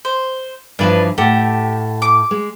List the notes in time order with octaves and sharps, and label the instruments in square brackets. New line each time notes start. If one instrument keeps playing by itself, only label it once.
[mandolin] C5
[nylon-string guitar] G2 E3 F3 [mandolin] D4 B4
[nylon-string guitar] A2 A4 F#5 [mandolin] G4
[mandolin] D6
[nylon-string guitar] G#3